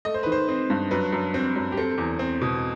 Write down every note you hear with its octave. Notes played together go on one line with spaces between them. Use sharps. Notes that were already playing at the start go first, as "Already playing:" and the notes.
A3 D#5
C5
D#3 B4
C5
C4
G2
F#2 B4
F#2
C4
F#2
G4
C4 A4
E2
C4
B2